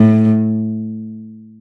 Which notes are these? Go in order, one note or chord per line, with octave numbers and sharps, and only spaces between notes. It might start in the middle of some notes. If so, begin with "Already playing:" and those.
Already playing: A2